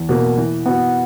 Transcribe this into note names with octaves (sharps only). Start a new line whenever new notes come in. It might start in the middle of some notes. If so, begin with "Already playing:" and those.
Already playing: E2
B2 A#3
E3
B3 F#4